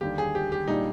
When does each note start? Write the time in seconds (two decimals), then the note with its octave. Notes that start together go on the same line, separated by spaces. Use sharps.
0.01 D#2 D3 G3 D4 G4
0.18 G#4
0.35 G4
0.52 G4
0.68 A#2 G3 D4 D#4